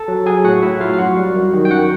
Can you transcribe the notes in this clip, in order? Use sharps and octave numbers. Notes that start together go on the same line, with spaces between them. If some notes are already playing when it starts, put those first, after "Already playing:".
Already playing: A4 A5
F#3
F#3 G#4 G#5
A2 F#4 F#5
A2 E4 E5
F#3 F4 F5
F5
F#2 F#4 F#5
G3
F#2
D#3
G5
F#2 F#4 F#5